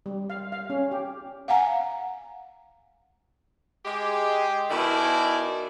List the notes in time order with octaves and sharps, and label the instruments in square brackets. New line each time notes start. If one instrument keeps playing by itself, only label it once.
[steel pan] G3
F5
F5
C#4
G4
[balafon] F5 F#5 G#5 A#5
[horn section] G#3 G4
B2 D#3 E4 D5 G#5